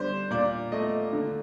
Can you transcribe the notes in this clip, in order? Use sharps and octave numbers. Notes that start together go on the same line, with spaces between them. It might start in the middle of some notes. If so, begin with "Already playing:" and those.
Already playing: D3 G3 C5
A#2 D5
A3 D#5
D3